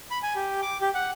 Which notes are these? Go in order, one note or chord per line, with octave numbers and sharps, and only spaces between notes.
B5
G#5
G4
D6
G4
F#5